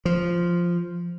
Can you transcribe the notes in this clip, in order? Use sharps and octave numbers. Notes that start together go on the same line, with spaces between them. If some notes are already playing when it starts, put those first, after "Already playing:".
F3